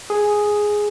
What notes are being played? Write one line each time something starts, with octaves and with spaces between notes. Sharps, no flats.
G#4